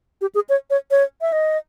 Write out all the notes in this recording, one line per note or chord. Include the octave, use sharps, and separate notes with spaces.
G4
G#4
C#5
C#5
C#5
E5
D#5